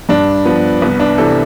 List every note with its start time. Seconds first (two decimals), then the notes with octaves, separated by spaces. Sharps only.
0.09 G2 D4
0.45 F3 B3
0.82 C2 B3
1.00 D4
1.18 C3 E3 A4